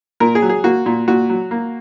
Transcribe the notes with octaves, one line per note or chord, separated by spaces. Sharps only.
A#2 A#4
G#4
F#3
G#4
A#3 F#4
A#2
A#2 F#4
F#3
A#3